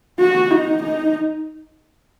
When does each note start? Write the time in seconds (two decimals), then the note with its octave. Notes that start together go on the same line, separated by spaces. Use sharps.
0.20 F#4
0.51 D#4
0.83 D#4